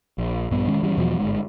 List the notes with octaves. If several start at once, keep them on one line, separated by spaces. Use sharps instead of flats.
A#1
A#1 G2 B3
E1 D#3 G#3 C#4
G#1 E3 G3 C#4
E2 B2 F3 F#3
G1 G#2